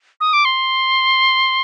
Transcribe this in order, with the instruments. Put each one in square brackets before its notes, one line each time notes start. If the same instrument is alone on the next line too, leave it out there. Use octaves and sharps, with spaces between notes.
[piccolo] D#6
D6
C6